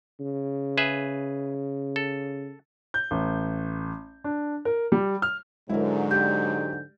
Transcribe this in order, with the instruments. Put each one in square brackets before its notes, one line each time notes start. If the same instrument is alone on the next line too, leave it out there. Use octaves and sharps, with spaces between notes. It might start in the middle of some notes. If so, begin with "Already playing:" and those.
[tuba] C#3
[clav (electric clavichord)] G#4 B4 E5
A4
[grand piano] G6
A1
D4
A#4
G3
F6
[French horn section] G#2 D3 F#3 [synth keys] G#3 [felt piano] E4 A#4
[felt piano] G4 D5 G5 [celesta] G6